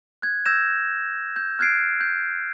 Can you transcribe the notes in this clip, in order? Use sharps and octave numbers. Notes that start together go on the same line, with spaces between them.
F#6 G#6
E6 G6 G#6 A#6 E7
G6
F6 F#6 G#6 A6 C7 D7
G6